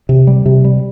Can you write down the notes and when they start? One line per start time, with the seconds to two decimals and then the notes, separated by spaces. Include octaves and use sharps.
0.09 C3
0.27 G3
0.46 C3
0.65 G3